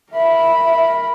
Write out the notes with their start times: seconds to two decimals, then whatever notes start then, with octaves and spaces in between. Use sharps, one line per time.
0.13 A#4 E5 B5